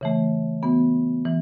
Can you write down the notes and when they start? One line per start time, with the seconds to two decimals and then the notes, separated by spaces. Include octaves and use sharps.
0.01 C#3 E3 A3
0.63 E3 B3 F#4
1.25 E3